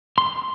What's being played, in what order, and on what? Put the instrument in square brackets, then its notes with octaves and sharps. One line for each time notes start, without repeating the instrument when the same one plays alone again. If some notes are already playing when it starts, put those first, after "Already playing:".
[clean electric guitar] C6